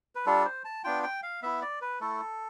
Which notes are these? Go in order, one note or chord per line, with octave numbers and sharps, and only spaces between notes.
B4
G3 D4 F4 A4
C5
A5
B3 D4 F4 G5
G5
F5
B3 E4 E5
D5
B4
A3 E4 A4